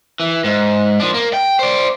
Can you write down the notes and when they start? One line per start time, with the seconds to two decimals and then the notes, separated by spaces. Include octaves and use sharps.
0.20 E3
0.44 G#2
1.00 F3 D4
1.14 A#3
1.33 G5
1.59 C5 D5